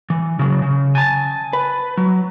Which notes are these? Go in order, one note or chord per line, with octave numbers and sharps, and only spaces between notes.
E3
C#3 F#3
C#3
G#5 A5
B4
F#3